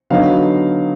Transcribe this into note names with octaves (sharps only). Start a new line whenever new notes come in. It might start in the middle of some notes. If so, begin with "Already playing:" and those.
D3 F#3 B3 D#4 F5